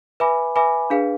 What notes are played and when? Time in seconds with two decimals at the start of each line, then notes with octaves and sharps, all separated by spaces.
0.20 B4 E5 G#5 B5 D6
0.56 B4 E5 G#5 B5 D6
0.90 D4 G#4 B4 F5